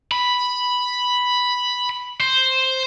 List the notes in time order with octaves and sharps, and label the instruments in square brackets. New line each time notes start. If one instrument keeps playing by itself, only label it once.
[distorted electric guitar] B5
C5